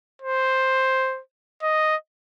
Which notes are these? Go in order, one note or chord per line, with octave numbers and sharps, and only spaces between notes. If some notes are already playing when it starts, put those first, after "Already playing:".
C5
D#5